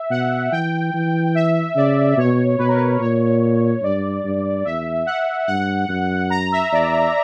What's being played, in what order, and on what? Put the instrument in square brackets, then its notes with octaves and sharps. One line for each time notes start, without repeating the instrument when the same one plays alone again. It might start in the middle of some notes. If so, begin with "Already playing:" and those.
Already playing: [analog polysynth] E5
[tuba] B2 [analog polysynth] F#5
[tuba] E3 [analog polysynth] G5
[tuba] E3
[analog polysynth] E5
[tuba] C#3 [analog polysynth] D5
[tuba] B2 [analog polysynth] C#5
[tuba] B2 [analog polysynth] B4
[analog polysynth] A#4
B4
[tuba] A#2 [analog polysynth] C#5
[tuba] G2 [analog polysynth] D5
[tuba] G2
[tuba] E2 [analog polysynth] E5
[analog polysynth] F#5
[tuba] G2 [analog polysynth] F#5
[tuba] F#2
[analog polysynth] A#5
E5
[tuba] E2 [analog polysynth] D5